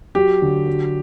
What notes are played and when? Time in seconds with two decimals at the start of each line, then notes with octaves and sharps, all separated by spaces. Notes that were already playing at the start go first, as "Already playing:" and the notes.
0.15 F#3 G4
0.42 D3
0.67 F#3